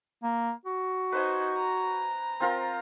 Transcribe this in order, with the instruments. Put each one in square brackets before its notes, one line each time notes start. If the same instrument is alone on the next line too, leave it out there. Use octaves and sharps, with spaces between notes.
[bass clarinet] A#3
F#4
[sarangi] D#4 [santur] B4 C5 G#5
[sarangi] A#5
[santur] C4 F4 A#4